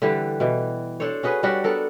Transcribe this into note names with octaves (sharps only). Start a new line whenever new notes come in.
D3 E3 G3 G4
B2 E3
D4 A4 C5 C#5
C#4 F#4 G#4 B4
G3 C#4 D4 F#4
B3 D4 A4 A#4